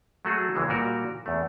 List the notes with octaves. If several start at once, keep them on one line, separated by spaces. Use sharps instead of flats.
F#3 A3 F#4 G#4 A4
C#2 E3 G#3
A#2 G3 F#4 A#4
E2 A3